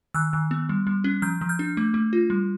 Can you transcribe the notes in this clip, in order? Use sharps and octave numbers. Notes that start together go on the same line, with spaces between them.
D#3 E6 F#6
D#3
B3
G3
G3
C#4
F3 F6 G6
F3
F6 G6
D4
A3
A3
F4
G3